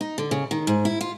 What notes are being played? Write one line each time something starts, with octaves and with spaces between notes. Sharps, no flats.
D#4
D3
C#3
D#3
G#2
E4
F4